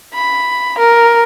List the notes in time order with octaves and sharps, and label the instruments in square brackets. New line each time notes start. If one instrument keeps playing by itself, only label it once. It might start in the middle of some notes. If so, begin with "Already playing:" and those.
[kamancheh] B5
A#4